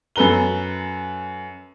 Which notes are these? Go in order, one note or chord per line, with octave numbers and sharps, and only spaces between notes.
F#2 A4 B4 A#5 G7